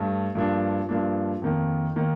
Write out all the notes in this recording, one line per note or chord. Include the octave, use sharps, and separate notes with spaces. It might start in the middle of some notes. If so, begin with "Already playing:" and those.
Already playing: G2 A3
G2 F3 A#3 D4
G2 F3 A#3 D4
F2 D#3 A#3
D#3 A#3